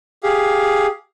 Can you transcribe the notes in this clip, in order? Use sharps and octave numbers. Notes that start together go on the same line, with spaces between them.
G4 G#4 F5